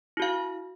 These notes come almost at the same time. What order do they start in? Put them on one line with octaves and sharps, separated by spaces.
E4 F#4 F5